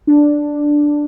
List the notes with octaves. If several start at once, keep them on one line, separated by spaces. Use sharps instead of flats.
D4